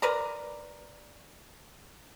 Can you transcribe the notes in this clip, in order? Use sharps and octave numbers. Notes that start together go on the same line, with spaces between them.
A#4 B4 D5 A#5